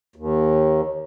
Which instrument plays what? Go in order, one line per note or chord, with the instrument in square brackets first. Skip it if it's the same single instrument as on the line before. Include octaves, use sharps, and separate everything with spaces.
[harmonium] D#2